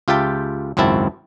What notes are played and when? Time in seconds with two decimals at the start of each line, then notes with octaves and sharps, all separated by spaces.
0.08 C#2 F4 G4 E5 G5 A5
0.77 G#1 C#2 F#2 C4 E4 A5